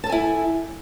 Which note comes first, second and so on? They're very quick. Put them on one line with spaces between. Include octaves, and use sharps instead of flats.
A5 A4 G#5 E4